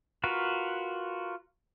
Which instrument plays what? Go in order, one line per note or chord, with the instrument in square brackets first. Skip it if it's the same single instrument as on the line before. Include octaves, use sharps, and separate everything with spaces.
[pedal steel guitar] F4 F#4 A#4 B4